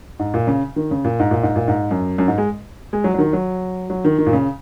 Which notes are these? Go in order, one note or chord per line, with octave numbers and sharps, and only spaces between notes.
G#2
A#2
C#3
D#3
C#3
A#2
G#2
A#2
G#2
A#2
G#2
F#2
F#2
G#2
G#3
G#3
F#3
F#3
D#3
F#3
F#3
D#3
D#3
A#2
C#3